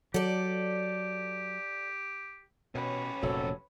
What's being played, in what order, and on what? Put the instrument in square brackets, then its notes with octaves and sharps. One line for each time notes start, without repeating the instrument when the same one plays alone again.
[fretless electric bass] F#3 [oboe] G4 [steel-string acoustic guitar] A4 D5
[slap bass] B2 [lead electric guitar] C#4 G4 [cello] B4 C#5
[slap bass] F1 A#2 F3 [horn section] F#3 A4